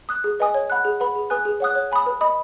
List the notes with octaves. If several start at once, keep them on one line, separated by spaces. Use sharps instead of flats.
D#6 F#6
G#4
B4 D#5 G#5 D#6
C#5
F#5 B5 F#6
G#4
B4 F#5 B5
G#4
B4 G#5 D#6 F#6
G#4
C#5 F#5 D#6 F#6
C#5
G#5 B5 D#6
B4
D#5 B5 D#6